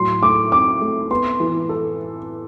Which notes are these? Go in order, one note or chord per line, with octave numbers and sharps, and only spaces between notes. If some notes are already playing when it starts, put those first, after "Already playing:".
Already playing: A2 F#3 C6
A3 D6
C4 D6
A3
B3 C6
E3
A4